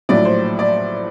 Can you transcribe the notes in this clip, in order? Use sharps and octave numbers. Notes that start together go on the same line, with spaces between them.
A#1 A2 F#3 D5
C5
D5